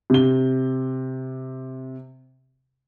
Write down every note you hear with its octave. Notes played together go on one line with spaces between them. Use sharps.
C3 G7